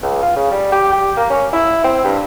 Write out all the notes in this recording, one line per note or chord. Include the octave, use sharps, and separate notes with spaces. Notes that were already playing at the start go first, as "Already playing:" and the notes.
C#2
F4
C#3
G3
G4
G4
A#3
C#4
E4
C4
G2